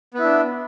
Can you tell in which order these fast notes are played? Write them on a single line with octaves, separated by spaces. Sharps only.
B3 E4 D4